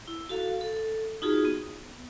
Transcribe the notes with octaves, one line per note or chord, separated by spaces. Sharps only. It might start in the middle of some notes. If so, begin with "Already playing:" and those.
E4
F#4 A4 F5
A4
D#4 F4 F#4 G#4
B3